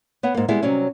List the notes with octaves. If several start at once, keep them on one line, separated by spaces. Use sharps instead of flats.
B3 C#5 F#5
G#2 A#3
G3 G#3 B3 E4
C3 F#3 G3 C4 C#4